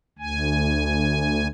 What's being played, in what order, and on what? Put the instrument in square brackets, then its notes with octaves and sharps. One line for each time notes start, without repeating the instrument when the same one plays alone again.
[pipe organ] D2 G#5